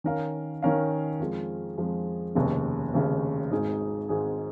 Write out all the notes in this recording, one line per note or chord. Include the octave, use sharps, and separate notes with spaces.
D#3 C#4 A#4 F5
D#3 C#4 A#4 F5
F2 F3 G#3
F2 F3 G#3
F1 D#2 C#3
F1 D#2 C#3
G#1 G#2 G#3 D#4 G#4
G#1 G#2 G#3 D#4 G#4